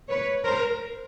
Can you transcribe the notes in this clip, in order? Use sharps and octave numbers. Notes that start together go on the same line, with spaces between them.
B4 C#5
A#4 C5